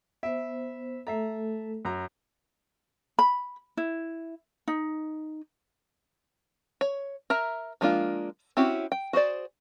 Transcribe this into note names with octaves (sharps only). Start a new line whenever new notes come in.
B3 C5 E5
A3 A4 E5 A#5
F#2 A#5
B5
E4
D#4
C#5
A#4 E5 A#5
F3 G#3 A#3 D4 F4
C4 C#4 E4 F#4 G4
G5
F#4 G#4 C5 D5